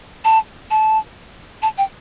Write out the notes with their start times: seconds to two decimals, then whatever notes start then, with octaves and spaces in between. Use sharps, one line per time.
0.24 A5
0.71 A5
1.62 A5
1.78 G5